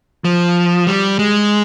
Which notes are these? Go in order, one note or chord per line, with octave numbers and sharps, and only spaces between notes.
F3
G3
G#3